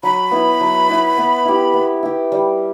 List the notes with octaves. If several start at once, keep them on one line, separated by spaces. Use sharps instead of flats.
F#3 B5
B3 E4
F#3
B3 E4
B3
E4 G4
B3
E4 G4
G3